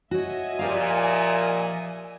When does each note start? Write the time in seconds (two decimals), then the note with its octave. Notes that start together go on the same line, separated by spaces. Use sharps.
0.11 F#4 C#5 D#5 E5 G#5
0.59 A#2 F3 G4 F5